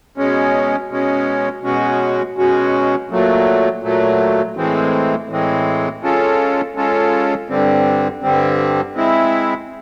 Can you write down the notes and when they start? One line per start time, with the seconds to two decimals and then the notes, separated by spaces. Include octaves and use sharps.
0.17 B2 G#3 C#4
0.90 B2 G#3 C#4
1.63 B2 G#3 C#4 F#4
2.37 B2 G#3 C#4 F#4
3.10 A#2 F#3 A3
3.83 A#2 F#3 A3
4.57 A2 E3 G#3 C4
5.29 A2 E3 G#3 C4
6.02 G#3 C#4 F4 A4
6.76 G#3 C#4 F4 A4
7.49 G2 D3 G3 C4
8.23 G2 D3 G3 C4
8.96 G#3 C4 E4